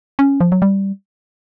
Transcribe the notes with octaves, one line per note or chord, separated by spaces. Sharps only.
C#4
F3
F#3
G3